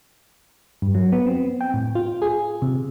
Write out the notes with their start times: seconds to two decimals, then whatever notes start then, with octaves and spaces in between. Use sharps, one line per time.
0.82 G2
0.95 F#3
1.12 B3
1.26 C4
1.61 G5
1.74 A2
1.95 F4
2.22 G#4
2.62 C3